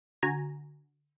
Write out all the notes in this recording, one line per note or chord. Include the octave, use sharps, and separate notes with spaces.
D3 F#4 G#5 A#5 G#6